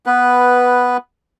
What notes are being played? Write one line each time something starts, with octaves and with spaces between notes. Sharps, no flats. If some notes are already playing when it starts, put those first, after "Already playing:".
B3 B4